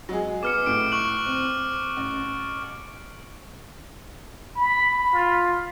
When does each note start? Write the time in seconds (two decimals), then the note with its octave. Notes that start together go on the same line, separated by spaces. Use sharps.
0.09 F#3 G#3 G#4
0.43 B3 D6 F6 C#7
0.66 A2 D7
0.92 C#6 F#6 F#7
1.26 C4
1.96 A1
4.56 B5
5.13 F4